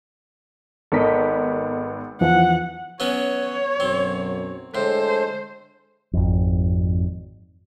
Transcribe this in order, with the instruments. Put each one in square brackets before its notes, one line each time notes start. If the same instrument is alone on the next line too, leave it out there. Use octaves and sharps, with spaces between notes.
[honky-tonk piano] G#1 B3 B6 [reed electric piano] A4 A#4 D#5
[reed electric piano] E2 E3 F3 [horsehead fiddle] F#5
[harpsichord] F#3 B3 C#4 [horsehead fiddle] C#5
[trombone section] B1 F#2 F#3 [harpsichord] C4
[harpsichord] A2 [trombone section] D3 G#3 A4 [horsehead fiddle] C5
[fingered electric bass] G#1 F2